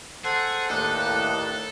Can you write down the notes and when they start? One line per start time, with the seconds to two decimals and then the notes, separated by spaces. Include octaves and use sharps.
0.24 G#4 A4 C5 F#5
0.70 D#2 A2 D4 D#4 A4 B4